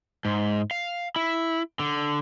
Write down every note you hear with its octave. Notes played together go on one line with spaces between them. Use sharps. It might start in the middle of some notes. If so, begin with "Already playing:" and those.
G#2
F5
E4
D3